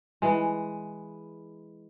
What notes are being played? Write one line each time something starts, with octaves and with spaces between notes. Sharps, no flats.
E3 G#3